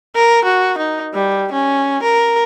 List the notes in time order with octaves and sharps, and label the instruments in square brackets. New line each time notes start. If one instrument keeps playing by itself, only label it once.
[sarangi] A#4
F#4
D#4
G3
C#4
A#4